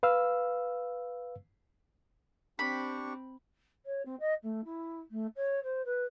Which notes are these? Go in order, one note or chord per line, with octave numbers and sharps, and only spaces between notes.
B4 F5 E6
C4 D4 G4 B5 C#6
C#5
C4
D#5
A3
E4
A3
C#5
C5
B4